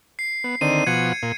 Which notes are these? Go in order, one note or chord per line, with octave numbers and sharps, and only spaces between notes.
C7
B3
D3 D#3 C4 D#7
B2 F3 F#5 G#6 C#7
A#2